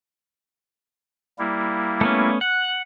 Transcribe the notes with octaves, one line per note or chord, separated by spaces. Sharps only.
G3 A#3 E4
A3 B3 C#4
F#5 F#6